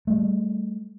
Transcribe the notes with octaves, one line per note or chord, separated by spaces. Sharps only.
G3 A3